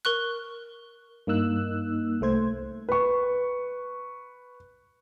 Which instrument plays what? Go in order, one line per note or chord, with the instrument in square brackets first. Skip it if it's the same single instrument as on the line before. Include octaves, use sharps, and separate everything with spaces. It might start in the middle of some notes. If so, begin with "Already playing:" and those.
[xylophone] A#4 C#6 F#6
[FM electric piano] G2 A#3 D#4 E6 F#6
C2 A3 C5 G#6
[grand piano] B4 C#6